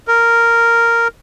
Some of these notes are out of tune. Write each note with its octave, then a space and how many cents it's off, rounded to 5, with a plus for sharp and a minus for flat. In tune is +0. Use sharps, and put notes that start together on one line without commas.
A#4 -5